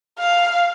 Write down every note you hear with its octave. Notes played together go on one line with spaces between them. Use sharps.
F5